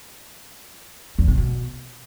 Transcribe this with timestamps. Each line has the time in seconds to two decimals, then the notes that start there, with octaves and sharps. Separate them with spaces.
1.19 E2
1.28 C3
1.38 B2